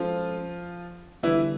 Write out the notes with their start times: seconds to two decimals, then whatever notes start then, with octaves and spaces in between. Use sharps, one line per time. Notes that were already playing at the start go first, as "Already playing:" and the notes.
Already playing: F3 G#3 C#4 F4 F#4 A4 C5
1.23 D3 E3 G3 B3 E4